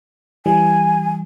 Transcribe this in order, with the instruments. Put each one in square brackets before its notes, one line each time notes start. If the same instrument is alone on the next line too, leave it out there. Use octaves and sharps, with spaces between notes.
[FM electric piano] E3 G3 [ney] G#5